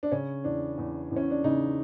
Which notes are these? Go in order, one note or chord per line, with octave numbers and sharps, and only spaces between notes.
D4
C#3 C#4
E2 D4
E2
E2
C#4
D4
C#3 D#4